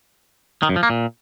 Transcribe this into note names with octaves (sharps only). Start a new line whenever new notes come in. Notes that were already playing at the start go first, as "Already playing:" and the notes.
D#3
F#2
F3
A#3
A#2